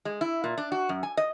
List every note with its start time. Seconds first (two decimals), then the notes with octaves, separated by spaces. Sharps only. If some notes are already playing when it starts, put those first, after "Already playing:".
0.05 G#3
0.21 E4
0.44 A#2
0.58 D4
0.72 F#4
0.89 F#2
1.03 G#5
1.17 D#5